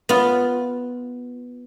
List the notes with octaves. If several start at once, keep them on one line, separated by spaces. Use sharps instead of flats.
B3 F4